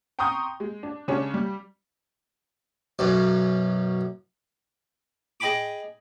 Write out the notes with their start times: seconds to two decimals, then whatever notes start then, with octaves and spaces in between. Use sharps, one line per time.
0.19 G5 A#5 C6 C#6 D#6 G6
0.60 G#3
0.83 D4
1.08 C#3 G#3 C#4 D4
1.34 G3
2.99 B1 F#2
5.40 G#4 D#5 G5 G#5 B5 D6